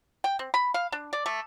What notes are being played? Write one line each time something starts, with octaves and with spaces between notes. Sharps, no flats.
G5
C4
B5
F5
D4
D5
A3